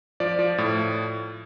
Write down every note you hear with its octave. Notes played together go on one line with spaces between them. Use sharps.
F3 D5
F3
A2